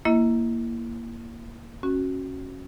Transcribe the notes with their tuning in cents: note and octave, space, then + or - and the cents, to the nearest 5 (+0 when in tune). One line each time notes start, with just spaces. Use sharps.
A#3 +0 E4 +15 D#5 +40
C#4 -20 F#4 +0